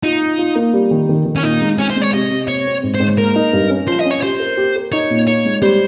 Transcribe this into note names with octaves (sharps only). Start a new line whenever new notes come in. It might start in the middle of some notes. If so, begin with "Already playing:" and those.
D#4 F4
F4
F4
A#3
G3
D#3
D#3
D#3
C#4
A#2 D#4
G#3
C4 C#4
C5
G#3
C#5
C3 D#5
C3
C4 C#5
C4
G#2
C5
G#2
A#3 A#4
D#4
G2
C#4
F3 C5
D#5
C#4
C#5
G4 C5
A#4
G4
A#4
D#4 C#5
A#2
D#4 C#5
G#3
G3 C5